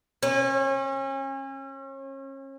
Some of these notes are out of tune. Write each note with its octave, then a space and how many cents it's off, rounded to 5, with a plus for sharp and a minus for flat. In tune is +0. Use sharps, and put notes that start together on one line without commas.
C#4 -35